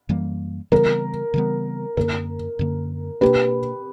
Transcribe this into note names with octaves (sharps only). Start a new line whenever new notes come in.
F#2 E3 G3 A#3
C#3 E3 G3 B3 A#4
C#3 E3 G3 B3
F#2 D3 A#3 A#4
F#2 D3 A#3
B2 A#3 D4 G4 B4